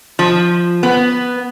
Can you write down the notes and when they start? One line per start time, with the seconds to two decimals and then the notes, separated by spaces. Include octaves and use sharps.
0.19 F3
0.83 B3